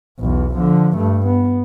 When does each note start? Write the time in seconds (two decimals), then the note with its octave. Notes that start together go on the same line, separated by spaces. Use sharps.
0.19 B1 E2
0.55 D3 F3
0.96 G2 A3
1.26 B3